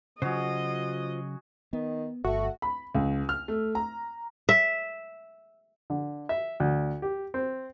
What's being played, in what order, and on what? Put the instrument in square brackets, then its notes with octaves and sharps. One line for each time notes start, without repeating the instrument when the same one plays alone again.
[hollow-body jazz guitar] C#3 F#3 [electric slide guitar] F4 C5 [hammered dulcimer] F#4 G#4 [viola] D#5
[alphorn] D#3 [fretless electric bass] B3
[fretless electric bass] G1 [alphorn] A3 [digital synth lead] F#4
[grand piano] B5
C#2
F6
A3
A#5
[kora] E5
[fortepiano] D3
E5
D2
G4
C4